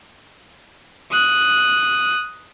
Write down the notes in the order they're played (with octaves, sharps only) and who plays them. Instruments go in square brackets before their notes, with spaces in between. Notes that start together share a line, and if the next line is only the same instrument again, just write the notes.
[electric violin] D#6 F#6